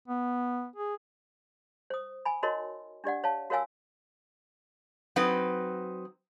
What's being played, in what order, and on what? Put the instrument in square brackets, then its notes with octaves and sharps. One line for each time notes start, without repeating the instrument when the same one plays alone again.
[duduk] B3
G#4
[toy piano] C5 D#6
G#5 B5
D#4 F#4 A#4 C#5 D#5 C6
D4 G4 D5 F#5
C#5 F5 A5
F#4 A#4 C#5 F5 G#5 E6
[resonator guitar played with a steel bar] F#3 C4 D#4 B4